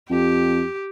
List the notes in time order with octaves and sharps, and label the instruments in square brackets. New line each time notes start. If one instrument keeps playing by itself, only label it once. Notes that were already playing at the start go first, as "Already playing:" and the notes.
[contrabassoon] F2 [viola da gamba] G4